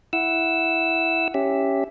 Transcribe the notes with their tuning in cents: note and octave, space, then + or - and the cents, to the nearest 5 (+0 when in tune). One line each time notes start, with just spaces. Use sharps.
E4 +0 F#5 +0 E6 +0
C#4 +0 G4 +0 E5 +0